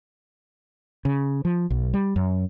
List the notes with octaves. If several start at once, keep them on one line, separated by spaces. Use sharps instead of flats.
C#3
F3
B1
G3
F#2